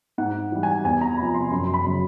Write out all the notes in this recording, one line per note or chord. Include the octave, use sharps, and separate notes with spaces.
G#2 F#5
E3 G3
G#5
E2 G#5
A#5
C3 F3 B5
C6
F#2 C6
B5
C#3 F#3